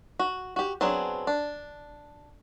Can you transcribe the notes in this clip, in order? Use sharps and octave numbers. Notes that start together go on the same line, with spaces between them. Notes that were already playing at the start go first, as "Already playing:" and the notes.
F#4
F#4 G4
F#3 B3 C4 D4 G#4
D4